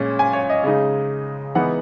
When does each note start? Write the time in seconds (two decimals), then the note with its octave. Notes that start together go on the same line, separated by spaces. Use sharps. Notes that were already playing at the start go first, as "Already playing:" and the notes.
Already playing: A#2 G#3 C#4
0.19 G#5
0.33 C#5
0.50 D#5
0.64 C#3 G#3 D#4
1.55 E3 G#3 B3 D#4 F#5